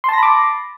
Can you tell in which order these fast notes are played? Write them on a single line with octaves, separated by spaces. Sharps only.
C6 A5 A#6 B5 D6